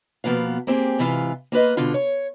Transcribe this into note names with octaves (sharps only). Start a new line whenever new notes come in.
B2 F3 A#3 B3 F5
A#3 C4 G4 G#4
G#2 C3 E3 F4 F5
A#3 F4 B4 D#5
B2 D3 F4
C#5